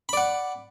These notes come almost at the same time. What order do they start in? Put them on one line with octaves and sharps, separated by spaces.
B5 D5 F#5